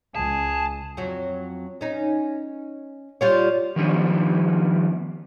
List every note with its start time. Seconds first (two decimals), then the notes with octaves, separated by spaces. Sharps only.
0.16 C#2 G#4 A5
0.97 F2 F#3
1.81 C#4 D#4
3.21 G3 F4 C#5
3.76 D#3 F3 G3 A#3 B3 C#4